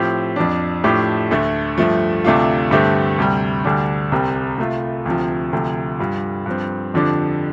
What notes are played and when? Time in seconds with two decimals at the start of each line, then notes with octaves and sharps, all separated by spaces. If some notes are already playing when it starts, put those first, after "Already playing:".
Already playing: A2 F3 C4 G4
0.36 F2 F3 D4
0.84 A2 F3 A3 D4 G4
1.31 D2 D3 A3
1.77 G2 F3 A3
2.25 D2 C3 A3 D4 F4
2.71 G2 D3 A3 C4 G4
3.18 D2 C3 G3
3.64 D2 D3 G3 D4
4.12 C2 C3 G3 C4
4.58 C3 A3 F4
5.06 D2 C3 F3
5.53 D2 C3 F3
5.99 G2 G3 F4
6.46 G2 F3 C4
6.94 F2 D3 F3 D4 G4